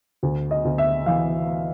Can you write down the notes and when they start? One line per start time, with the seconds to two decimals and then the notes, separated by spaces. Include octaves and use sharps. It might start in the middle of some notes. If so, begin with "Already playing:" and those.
0.23 D2
0.51 D#5
0.65 D2
0.78 E5
1.06 E3 F5